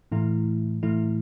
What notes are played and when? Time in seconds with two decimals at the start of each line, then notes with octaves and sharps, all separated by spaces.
0.12 A2 E3 A3 E4
0.83 A2 E3 A3 E4